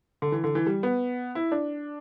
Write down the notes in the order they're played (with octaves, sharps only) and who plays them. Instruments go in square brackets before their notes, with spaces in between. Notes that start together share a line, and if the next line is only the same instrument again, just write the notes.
[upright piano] D3
E3
D3
E3
G3
B3
E4
D4